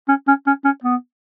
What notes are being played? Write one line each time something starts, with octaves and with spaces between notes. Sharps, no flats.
C#4
C#4
C#4
C#4
B3